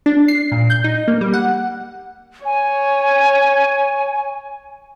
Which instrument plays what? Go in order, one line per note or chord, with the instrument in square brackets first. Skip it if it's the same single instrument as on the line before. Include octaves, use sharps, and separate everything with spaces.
[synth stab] D4
C7
A#2
G6
D#4
A#3
G3
F#5
[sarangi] C#5 [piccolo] G#5